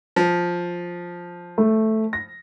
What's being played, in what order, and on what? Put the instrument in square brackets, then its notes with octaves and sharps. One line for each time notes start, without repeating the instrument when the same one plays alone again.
[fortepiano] F3
[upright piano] A3
A#6